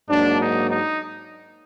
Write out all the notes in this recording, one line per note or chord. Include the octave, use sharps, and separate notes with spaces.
G#2 F#3 A#3 D4
D#4
D#4